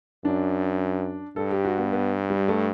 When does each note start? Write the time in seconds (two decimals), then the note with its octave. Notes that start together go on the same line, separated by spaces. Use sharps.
0.24 F#2 D4
1.36 G2 A4
1.51 G4
1.64 F#4
1.78 B3
1.93 B3
2.30 G3
2.48 A3